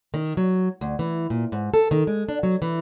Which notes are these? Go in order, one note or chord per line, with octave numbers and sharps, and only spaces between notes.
D#3
F#3
D2
E3
A#2
G#2
A4
D#3
G#3
D4
F#3
E3